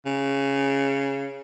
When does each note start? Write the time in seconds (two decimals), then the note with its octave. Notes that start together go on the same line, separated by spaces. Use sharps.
0.06 C#3